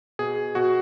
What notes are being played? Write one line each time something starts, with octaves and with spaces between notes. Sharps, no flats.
B2 G#4
B2 F#4